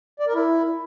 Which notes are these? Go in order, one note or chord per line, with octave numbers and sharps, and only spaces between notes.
D5
A#4
E4